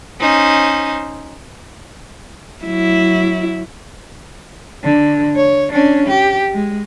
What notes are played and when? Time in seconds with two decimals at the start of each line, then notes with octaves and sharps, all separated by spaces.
0.20 C#4 D#4 C5
2.63 F#3 E4
4.84 D3
5.36 C#5
5.73 C#4 D4
6.07 G4
6.54 G#3